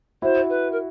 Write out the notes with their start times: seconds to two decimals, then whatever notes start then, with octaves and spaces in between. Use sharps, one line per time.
0.22 E4 F#4 C5
0.49 B4
0.72 A#4